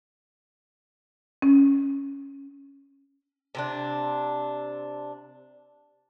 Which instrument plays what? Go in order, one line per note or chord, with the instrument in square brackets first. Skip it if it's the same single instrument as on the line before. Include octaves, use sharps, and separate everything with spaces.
[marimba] C#4
[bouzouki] C3 C4 D4